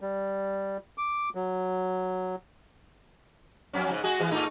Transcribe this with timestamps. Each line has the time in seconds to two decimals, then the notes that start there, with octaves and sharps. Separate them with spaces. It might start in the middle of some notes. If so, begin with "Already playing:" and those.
0.01 G3
0.98 D6
1.35 F#3
3.73 F2 F#3 C#4
3.91 G#2 C#3
4.04 G#3 F#4 G#4
4.20 E3 G#3 B3
4.31 A2 A3 D#4